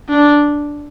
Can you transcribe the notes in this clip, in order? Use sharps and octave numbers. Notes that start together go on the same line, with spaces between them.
D4